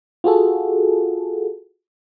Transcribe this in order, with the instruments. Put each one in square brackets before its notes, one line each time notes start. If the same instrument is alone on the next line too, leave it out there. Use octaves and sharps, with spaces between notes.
[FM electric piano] F4 F#4 G#4 A4